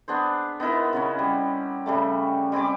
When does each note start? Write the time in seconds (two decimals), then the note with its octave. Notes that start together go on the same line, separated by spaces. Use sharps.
0.08 B3 D4 G#4 C5
0.60 B3 D#4 E4 A#4
0.93 C#3 B3 C#4
1.19 G3
1.86 C#3 G3 A3
2.52 G3 C4 G#5 D6